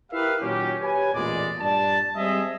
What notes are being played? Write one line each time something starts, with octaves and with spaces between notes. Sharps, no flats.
E4 G4 A#4 B4 E5 F5
A#2 D#3 F#3 C#4 G4
G4 B4 C#5 G#5
A1 E2 A#2 G#3 D5
G2 A#2 D5 A5
G3 G#3 C4 G#4 D#5 E5